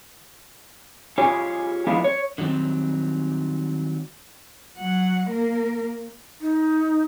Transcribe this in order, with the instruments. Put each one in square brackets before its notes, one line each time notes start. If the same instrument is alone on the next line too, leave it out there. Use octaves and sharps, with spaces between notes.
[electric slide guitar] F4 G4 G#4 C#5 G#5
F3 G#3 B3 D4 E4 F4
C#5
D3 D#3 F#3 G3 C4
[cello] F#3 F#5
A#3 A#4
[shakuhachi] D#4